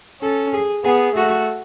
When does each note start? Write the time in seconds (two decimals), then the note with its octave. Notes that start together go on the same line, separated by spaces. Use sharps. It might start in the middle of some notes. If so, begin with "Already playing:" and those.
0.22 C#4 A4
0.53 G#4
0.85 B3 G#4
1.15 A3 F#4